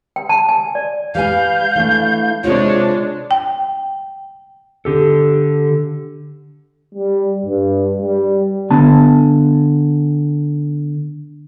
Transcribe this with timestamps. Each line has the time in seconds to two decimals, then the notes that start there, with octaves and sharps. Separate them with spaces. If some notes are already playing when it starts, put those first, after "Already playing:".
0.16 G5
0.29 A5
0.49 G#5
0.75 D5
1.15 G3 B4 F5 G#5 G6
1.75 E3 A3 D4
2.44 C3 G#3 C4 D4 F4 C#5
3.31 G5
4.85 D3 G4 A4
6.94 G3
7.46 G2
8.02 G3
8.71 D3 B3 G#5 A5